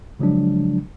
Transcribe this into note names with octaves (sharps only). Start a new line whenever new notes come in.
C#3 F3 F#3 G#3 D4